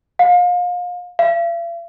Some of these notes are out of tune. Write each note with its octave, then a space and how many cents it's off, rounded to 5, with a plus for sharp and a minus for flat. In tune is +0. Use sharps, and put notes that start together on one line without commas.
F5 +35
F5 -45